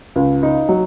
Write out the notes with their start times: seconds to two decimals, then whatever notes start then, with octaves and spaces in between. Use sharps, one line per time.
0.16 C#2
0.43 D#4
0.69 F#3